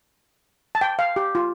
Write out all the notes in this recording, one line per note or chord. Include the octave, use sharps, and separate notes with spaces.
A5
G5
F5
G4
F4